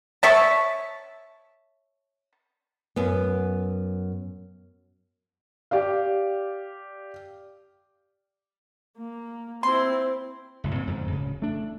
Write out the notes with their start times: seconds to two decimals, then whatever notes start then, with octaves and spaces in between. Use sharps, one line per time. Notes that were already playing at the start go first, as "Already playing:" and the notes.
0.23 C#5 E5 A5
2.96 F#2 B3
5.71 G4 D5 F5
8.98 A#3
9.63 C4 E4 C6
10.64 F#1 C#2 A2
10.75 A#2 D3 C4
10.87 F2 G#2 D3 F3
11.10 D1 C#3
11.42 A3 D4